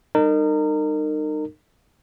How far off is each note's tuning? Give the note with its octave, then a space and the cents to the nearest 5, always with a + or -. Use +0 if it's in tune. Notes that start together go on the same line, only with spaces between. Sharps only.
G3 +0 D#4 -30 A#4 -30